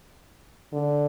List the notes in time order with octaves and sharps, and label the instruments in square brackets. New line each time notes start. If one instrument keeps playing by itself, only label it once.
[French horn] D3